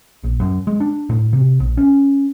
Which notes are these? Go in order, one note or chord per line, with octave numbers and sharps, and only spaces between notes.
A#1
F#2
G#3
D4
A2
C3
A#1
C#4